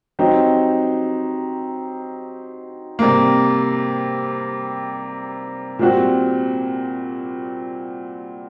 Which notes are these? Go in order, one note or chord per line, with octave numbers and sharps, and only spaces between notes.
F#3 C4 D#4 G4
C3 G3 A#3
A#2 G3 C4 F#4